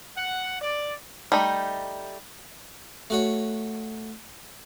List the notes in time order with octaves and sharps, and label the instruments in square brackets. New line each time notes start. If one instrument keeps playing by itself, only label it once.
[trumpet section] F#5
D5
[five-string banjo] G3 A3 D#4
[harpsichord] A3 F#4 C#5